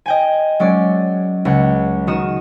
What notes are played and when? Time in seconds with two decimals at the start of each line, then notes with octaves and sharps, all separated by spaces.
0.06 D#5 G5 G#5
0.60 F#3 G#3 C#4 D5
1.45 C#2 F#5
2.07 D#3 F#4 D#6 E7